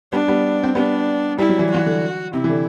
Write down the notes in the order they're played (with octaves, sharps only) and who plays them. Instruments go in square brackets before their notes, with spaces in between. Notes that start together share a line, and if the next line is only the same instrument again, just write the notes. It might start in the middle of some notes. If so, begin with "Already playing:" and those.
[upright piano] G3 B3 [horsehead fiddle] D4
[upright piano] G3 B3
C4
[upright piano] G3 B3 [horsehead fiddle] D4
[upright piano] G3 [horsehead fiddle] E4
[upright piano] F#3
E3 G3
[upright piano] E3 [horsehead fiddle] F#4
[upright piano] D3
[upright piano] C3 [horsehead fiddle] E4
[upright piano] E3
D3